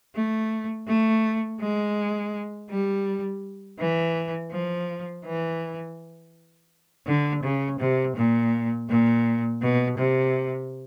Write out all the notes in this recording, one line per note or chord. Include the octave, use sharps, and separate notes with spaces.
A3
A3
G#3
G3
E3
F3
E3
D3
C#3
C3
A#2
A#2
B2
C3